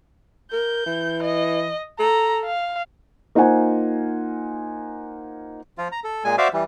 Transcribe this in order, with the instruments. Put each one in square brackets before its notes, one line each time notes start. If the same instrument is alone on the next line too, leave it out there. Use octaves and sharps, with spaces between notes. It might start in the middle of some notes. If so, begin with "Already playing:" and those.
[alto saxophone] A#4 [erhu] G6
[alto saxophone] E3
[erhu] D#5
[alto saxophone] A4 [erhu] A#5
[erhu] F5
[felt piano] A#3 D#4 F4 C5 F#5 G#5
[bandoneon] F3 F4
A#5
A4
A#2 G#3 G#5
F#4 C5 D5 E5 F5
E3 G3